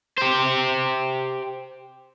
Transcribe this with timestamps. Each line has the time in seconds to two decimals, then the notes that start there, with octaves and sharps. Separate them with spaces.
0.18 G4 C5